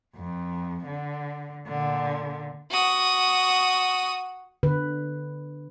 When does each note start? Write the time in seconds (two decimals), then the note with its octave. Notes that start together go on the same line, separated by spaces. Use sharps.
0.16 F2
0.87 D3
1.68 A#2 D3
2.70 F#4 D#6
4.63 D3 B4